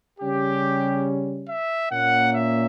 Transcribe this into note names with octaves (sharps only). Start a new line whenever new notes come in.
C#3 G3 C#4 G4
E5
A#2 A#3 C#4 F#5
E5